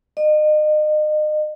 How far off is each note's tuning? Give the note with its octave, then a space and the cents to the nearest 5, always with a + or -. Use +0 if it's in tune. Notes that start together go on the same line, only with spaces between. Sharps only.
D#5 -35